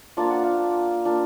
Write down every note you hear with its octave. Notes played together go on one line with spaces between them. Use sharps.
A#3 D4 F4 F5
F#5
F5
A#3 D4 F4